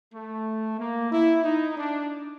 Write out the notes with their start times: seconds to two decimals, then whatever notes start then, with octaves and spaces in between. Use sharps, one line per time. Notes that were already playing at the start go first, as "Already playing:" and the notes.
0.13 A3
0.79 A#3
1.12 E4
1.43 D#4
1.76 D4